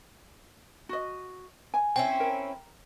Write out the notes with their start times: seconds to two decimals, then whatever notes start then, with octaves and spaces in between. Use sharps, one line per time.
0.89 F#4 D#5
1.74 G#5
1.96 C4 C#4 E4 G5
2.20 A#4